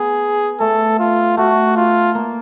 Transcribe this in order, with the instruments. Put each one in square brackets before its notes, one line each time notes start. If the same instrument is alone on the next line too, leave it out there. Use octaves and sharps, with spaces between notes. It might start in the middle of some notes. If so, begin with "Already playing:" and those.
Already playing: [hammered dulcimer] B3 [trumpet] G#4
[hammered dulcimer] A3 [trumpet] A4
[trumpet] F4
[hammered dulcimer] A3 [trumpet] F#4
[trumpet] F4
[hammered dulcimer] A#3